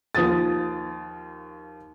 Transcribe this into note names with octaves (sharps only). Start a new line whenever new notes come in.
D#2 F3 F4 D#6 A6